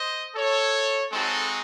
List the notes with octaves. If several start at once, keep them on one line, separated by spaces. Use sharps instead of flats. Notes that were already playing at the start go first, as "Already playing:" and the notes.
Already playing: C5 D#5
A4 C#5
G#3 C4 D#4 F#4 A4